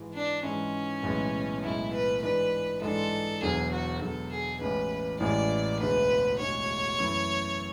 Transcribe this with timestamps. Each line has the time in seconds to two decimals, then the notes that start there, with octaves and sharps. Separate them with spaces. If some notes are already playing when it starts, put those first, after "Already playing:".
Already playing: G#2 E3 G#3
0.14 D4
0.44 G#2 E3 G#3 C#4
1.03 B1 A2 E3 G#3
1.63 B1 A2 E3 G#3 E4
1.93 B4
2.22 G#2 E3 G#3 D4 B4
2.81 G#2 E3 G#3 D4 A4
3.42 E1 E2 D3 F#3 G#4
3.71 F#4
4.01 E1 E2 D3 F#3 A4
4.31 G#4
4.61 A1 A2 E3 G#3 C#4 B4
5.20 A1 A2 E3 G#3 C#4 D5
5.80 E1 D2 D3 G#3 B4
6.39 E1 D2 D3 G#3 C#5
6.99 F#2 E3 A3 E4